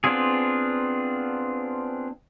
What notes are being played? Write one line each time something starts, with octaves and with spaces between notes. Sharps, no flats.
B3 C4 D4 F4 G#4